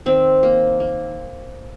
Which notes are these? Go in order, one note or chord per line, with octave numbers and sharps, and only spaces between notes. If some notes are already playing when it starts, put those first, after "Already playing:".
D#3 C4
A#3
A#3